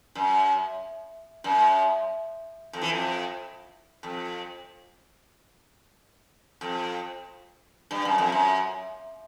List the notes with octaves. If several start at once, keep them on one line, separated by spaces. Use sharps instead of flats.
F#2
F#2
F2
E3
F2
F2
F2
G2
F#2
F2
F#2